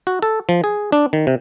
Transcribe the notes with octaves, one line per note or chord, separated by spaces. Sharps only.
F#4
A4
F3
G#4
D4
D#3
C3